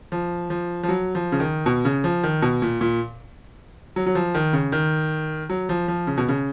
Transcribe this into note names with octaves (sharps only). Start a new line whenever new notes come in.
F3
F3
F3
F#3
F3
C#3
D#3
B2
C#3
F3
D#3
B2
A#2
A#2
F#3
F#3
F3
D#3
C#3
D#3
F#3
F3
F3
C#3
B2
C#3